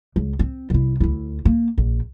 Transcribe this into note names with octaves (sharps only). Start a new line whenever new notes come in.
C#2
C4
C2 E4
D2 E4
A#3
A#1